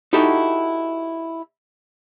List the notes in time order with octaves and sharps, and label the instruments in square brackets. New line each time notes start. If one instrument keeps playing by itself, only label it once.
[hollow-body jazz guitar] D#4 E4 F#4 G4 A4